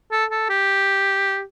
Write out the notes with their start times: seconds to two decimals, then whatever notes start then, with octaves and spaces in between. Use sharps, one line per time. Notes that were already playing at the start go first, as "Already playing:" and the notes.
0.12 A4
0.31 A4
0.49 G4